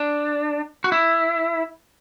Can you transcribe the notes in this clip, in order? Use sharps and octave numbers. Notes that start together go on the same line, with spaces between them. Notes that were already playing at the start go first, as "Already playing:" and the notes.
Already playing: D4
F#4
E4